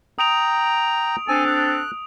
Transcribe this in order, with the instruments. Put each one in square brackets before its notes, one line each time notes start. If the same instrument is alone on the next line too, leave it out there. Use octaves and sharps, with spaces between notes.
[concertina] G5 A#5 [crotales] D#6 D7 F7
[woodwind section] C4 D4 A4 [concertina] G#5
[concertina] F#6